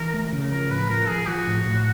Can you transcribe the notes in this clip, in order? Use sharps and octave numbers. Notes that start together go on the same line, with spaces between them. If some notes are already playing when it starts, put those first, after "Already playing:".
Already playing: E3 A#4
A3
C#3
F3 A#4
A2 B4
F3 A#4
F3 G#4
F3 F#4
A2
A2